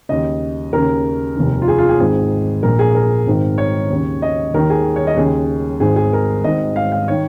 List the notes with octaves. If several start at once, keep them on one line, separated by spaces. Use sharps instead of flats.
D#2 C#3 D#5
D#2 C#3 A#4
F1 D#2 D#3
F4
G#4
F4
G#4
G#1 G#2 D#3 G#4
A#1 A#2 A#4
G#4
A#4
G#1 G#2 D#3
C#5
D#2 C#3
D#5
D#2 D#3 A#4
G#4
C#5
D#5
D#2 C#3 G#4
G#1 G#2 D#3 G#4
G#4
A#4
G#1 G#2 D#3 D#5
F5
F5
D#3 C#5